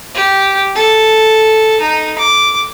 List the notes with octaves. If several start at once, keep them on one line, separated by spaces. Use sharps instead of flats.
G4
A4
D#4
D6